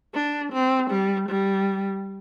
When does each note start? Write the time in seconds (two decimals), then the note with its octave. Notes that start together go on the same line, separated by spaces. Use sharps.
0.14 D4
0.53 C4
0.90 G3
1.29 G3